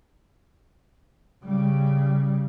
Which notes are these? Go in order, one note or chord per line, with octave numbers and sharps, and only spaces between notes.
C#3 G3